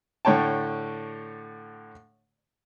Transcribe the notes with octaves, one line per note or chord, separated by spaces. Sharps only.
A2 D3 C#5 G5 A5